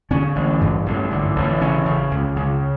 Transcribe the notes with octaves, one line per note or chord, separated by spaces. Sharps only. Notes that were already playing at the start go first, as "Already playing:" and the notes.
D3 C#4
A1
G2
A1
D3
A1
C#3 C#4
C#3
C#2
C#3